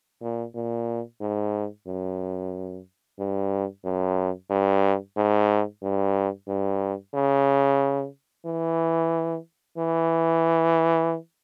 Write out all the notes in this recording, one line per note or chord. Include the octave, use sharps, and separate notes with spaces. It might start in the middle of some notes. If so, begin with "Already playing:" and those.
A#2
A#2
G#2
F#2
G2
F#2
G2
G#2
G2
G2
C#3
E3
E3